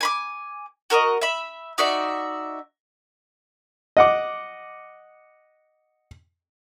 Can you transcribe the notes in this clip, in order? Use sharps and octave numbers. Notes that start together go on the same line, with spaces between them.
G#5 B5 D6
F#4 A#4 D5 D#5
E5 B5
D#4 F#4 D5 E5
D#5 F#5 D6